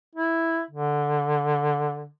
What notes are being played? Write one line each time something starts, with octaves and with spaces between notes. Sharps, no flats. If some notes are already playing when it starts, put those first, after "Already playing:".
E4
D3